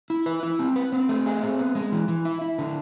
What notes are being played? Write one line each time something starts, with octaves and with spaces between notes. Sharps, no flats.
E4
B4
E4
C4
B4
C4
A3
G#4
C4
B3
G#3
E3
E3
E4
E4
D3